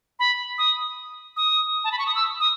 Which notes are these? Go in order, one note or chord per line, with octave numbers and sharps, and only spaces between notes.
B5
D#6
D#6
A5
B5
C#6
D#6
E6
D#6